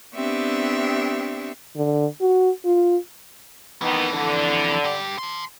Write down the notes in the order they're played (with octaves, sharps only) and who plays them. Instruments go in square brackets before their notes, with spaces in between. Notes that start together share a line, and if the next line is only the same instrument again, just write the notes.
[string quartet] B3 C4 D4 G4 E5 C#6
[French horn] D3
F#4
F4
[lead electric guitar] F2 E3 [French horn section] D#3 B3 D#4
[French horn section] D3
[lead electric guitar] G2 G4
A5 C6